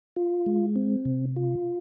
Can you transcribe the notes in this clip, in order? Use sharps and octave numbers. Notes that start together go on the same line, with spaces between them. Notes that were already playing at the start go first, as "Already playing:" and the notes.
F4
G#3
C4
C3
F4